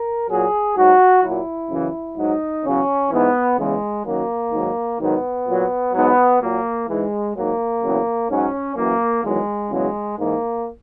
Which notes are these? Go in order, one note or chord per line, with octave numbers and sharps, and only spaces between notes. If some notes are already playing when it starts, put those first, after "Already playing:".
Already playing: A#4
A#2 F#3 G#4
G#2 F#3 F#4
A#2 F#3 E4
F#2 C#3 E3
G#2 F#3 D#4
E2 C#3 F#3 C#4
G#2 E3 B3
E2 C#3 E3 G#3
F#2 D#3 F#3 A#3
G#2 D#3 F#3
G#2 D#3 F#3 B3
A#2 F#3
G#2 F#3 B3
A#2 F#3 A#3
G#2 E3 G#3
G#2 F#3 A#3
E2 C#3 F#3
G#2 F#3 C#4
F#2 E3 A#3
E2 D#3 F#3 G#3
E2 C#3 F#3 G#3
G#2 E3 A#3